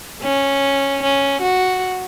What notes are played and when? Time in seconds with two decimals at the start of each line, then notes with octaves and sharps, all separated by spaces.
0.22 C#4
1.03 C#4
1.42 F#4